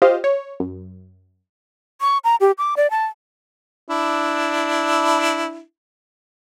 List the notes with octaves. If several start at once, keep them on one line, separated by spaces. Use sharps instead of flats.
F4 G4 C5 D#5 F5
C#5
F#2
C#6
A#5
G4
D6
D5
A5
D4 E4